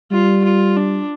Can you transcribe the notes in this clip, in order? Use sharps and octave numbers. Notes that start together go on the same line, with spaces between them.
G3 F4
F4
D4